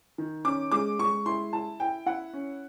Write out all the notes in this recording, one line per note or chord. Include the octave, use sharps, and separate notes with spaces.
D#3
C#4 D6
G#3 D6
G#3 C#6
E4 C6
E4 A5
E4 G5
E4 F#5
C#4